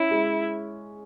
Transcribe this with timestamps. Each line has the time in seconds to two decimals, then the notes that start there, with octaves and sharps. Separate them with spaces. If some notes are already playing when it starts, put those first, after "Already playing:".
Already playing: C#4 E4
0.11 G#3